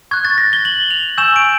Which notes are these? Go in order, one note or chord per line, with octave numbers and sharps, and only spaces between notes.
C#6 F#6 G#6
A6
A#6
G7
F#7
F7
G#5 C#6 E6 G6 E7
D7